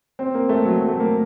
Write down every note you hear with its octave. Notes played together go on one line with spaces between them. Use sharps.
C4
A#3
A3
F#3
F#3
A3
A#3